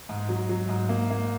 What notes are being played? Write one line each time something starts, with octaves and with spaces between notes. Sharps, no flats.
G#2
F#3
F#3
G#2
A#3
A#3